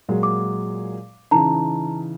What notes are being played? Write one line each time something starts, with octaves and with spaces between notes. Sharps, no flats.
A#2 F#3 G#3
D6
C#3 E3 D#4 A5 A#5